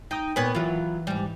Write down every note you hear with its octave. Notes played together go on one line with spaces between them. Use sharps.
D#4 G5 D#6
A#2 B3 B4 C#5
E3 F#3 F4
G#2 G3